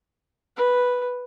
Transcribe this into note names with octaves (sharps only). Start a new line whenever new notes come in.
B4